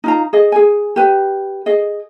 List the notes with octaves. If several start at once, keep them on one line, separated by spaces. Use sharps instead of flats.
D#4 F4 A#5
G#4 D#5
G#4 G#5
G4 B4
G#4 D#5